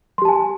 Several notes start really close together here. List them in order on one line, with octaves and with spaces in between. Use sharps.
C6 G4 A5 G#5